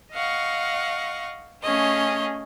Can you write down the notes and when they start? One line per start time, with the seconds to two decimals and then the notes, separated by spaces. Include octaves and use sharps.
0.14 D#5 F5 F#5 C#6
1.62 A3 C#4 G#4 C#5 D#5 F5